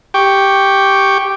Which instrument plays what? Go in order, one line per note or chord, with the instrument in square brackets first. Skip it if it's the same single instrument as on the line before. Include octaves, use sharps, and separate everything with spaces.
[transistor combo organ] G4 G5 C#6